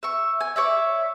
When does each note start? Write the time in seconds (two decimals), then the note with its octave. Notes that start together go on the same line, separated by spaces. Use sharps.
0.03 E5 C#6
0.41 G#5
0.56 C#5 D5 E5